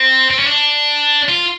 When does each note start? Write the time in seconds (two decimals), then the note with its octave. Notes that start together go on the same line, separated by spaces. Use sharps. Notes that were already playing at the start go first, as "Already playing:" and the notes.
Already playing: C4
0.31 C4
0.39 C#4
0.47 D4
1.29 F4